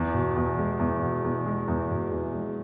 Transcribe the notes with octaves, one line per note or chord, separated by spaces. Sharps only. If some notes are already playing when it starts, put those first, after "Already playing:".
Already playing: E2
B2
E2
G#3
E2
B2
E2
G#3
E2
B2
E2
G#3